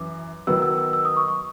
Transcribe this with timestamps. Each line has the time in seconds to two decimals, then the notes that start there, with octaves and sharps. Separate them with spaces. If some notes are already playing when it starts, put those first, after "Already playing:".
Already playing: F#2 E3 D6
0.47 D#3 F#3 B3 D#4 F#4 E6
0.62 E6
0.78 E6
0.93 E6
1.05 D#6
1.17 C#6
1.28 C#6